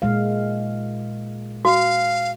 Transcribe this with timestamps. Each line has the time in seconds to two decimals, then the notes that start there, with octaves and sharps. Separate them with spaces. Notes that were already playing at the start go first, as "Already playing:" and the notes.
0.02 A#2 G#3 F5
1.65 F#4 F5